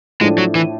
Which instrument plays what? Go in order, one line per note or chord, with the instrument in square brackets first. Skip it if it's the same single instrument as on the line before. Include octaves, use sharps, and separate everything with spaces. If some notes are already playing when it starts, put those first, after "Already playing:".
[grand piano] A2 F3 A3 D4 [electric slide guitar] G#3
[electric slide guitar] F#3
E3